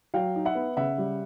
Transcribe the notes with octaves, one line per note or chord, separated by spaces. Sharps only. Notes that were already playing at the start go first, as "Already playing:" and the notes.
F#3 F5 G5
D#4
E5 F#5
B3
C#3 E5 F#5
G3